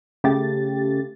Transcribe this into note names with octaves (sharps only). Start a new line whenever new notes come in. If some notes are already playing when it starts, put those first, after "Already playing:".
C#3 A3 G4 A6